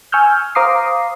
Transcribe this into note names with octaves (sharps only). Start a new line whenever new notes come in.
G#5 C#6 E6 F6 G6
C5 F5 A#5 D6 D#6 C7